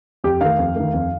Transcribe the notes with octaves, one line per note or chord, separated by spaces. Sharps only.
F2 G4
D#3 A3 F5
F2
D#3 A3
F2